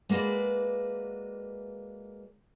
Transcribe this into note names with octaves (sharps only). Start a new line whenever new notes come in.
G#3 A#3 F#4 B4 D5